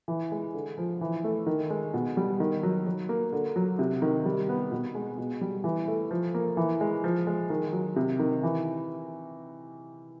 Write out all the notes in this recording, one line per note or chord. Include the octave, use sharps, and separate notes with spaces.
E3
G#3
D3
F3
E3
A3
D#3
G#3
B2
G3
D#3
F#3
F#3
A#3
D3
F#3
C3
D#3
G3
B3
B2
G#3
B2
G3
E3
A3
F3
A#3
E3
G#3
F3
G#3
D#3
F#3
C3
D#3
E3